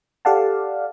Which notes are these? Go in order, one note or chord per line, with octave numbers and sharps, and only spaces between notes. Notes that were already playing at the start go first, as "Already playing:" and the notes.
G4 A4 D5 F5 F#5 A5